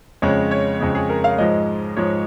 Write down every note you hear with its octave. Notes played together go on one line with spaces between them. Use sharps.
F2 C#3 G#3 C#5
C#5
F2 C#3 G#3
G#4
A#4
F5
G#2 F3 G#3 D#5
G#2 F3 G#3 C#5